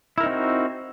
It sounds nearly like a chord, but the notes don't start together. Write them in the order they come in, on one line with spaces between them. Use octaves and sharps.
E4 A#4 D#4 C4 F#4